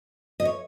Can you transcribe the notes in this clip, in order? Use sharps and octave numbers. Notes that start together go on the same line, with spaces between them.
D#5
C#5